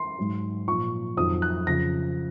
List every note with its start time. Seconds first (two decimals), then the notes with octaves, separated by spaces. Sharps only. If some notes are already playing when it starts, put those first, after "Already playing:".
Already playing: C6
0.18 G#2 F#3
0.68 A#2 F3 C#6
1.17 F2 D#3 F#3 D#6
1.42 F#6
1.67 F2 C#3 F3 A#6